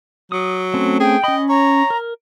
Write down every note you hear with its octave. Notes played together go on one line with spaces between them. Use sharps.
F#3 D#6
A3 C4 C#4
G#4 G5
C#4 D#5 B5
C#5 A#5
A#4